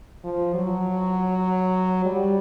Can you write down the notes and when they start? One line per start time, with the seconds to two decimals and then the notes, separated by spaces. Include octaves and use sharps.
0.24 F3
0.54 F#3
2.05 G3